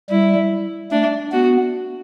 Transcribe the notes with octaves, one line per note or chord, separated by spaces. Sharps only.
G3 E4
A3 D4
B3 F#4